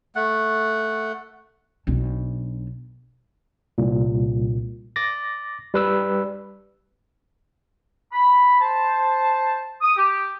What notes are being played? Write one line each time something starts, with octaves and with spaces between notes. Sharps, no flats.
A3 F#5
B1 D4
C2 A#2
D6 A6 A#6
G3 B4 E6
B5
C5 A5
D#6
G4